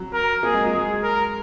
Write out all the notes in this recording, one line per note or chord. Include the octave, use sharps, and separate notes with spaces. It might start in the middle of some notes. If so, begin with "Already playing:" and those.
Already playing: F#3
A#4
A#3 G#4
G#3
F#3
G#3 G#4
A#4